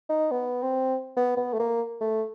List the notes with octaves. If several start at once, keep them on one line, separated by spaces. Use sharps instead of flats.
D#4
B3
C4
B3
B3
A3
A#3
A3